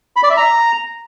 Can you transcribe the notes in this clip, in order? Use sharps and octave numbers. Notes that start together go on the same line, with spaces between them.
B5
D5
E5
A#5